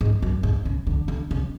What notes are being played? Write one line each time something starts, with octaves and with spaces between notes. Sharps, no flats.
G#2
F#2
G#2
C#3
D3
D3
C#3